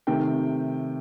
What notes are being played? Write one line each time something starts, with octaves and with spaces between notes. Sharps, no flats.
C3 D#3 A3 G5